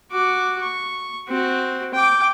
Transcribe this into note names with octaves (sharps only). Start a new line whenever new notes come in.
F#4 D6
C#6
C4 F#4
G5 D6